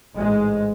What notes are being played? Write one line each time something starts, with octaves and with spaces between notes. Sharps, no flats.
A1 G#2 G#3